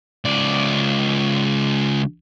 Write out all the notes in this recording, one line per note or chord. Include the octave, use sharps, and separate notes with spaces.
C#2 D5